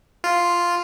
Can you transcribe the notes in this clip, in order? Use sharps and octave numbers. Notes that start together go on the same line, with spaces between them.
F4